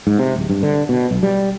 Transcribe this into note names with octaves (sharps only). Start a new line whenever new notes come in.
G#2
C3
D1
G2
D3
B2
B1
G3